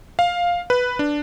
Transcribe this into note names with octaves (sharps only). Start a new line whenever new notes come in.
F5
B4
D4